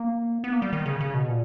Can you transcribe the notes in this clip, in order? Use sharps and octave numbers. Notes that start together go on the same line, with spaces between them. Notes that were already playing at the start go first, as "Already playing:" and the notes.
Already playing: A#3
B3
A#3
G3
D#3
C#3
C#3
B2
A#2